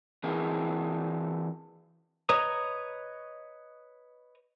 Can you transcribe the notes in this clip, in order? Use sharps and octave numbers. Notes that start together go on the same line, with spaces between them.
E3 C4 E4 G#4 A#4
B4 C#5 D#5 A#5 D#6